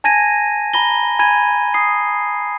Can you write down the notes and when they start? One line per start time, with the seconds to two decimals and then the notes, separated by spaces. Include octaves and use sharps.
0.04 G#5 A5 G#6 A#6 D#7
0.74 A#5 B5 A#6 G7
1.19 G#5 B5 G#6 D#7
1.74 D#6 C7